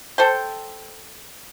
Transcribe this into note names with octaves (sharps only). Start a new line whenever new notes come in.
A4 C5 G5